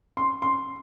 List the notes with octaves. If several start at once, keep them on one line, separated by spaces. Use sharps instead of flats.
C6
C6